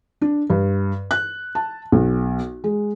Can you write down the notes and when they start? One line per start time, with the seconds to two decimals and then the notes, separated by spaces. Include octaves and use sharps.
0.21 D4
0.50 G2
1.11 F#6
1.55 A5
1.92 B1
2.64 G#3